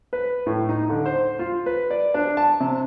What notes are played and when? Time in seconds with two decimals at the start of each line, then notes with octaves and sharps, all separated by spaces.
0.13 B4
0.46 A2
0.69 D#4
0.90 D3
1.06 C5
1.39 F4
1.66 B4
1.91 D5
2.14 D4
2.37 A5
2.60 C3